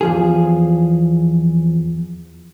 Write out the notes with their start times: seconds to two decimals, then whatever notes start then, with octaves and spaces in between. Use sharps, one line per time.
0.01 E2 F3 G#4